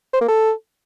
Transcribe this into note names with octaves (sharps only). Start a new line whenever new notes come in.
C5
A#3
A4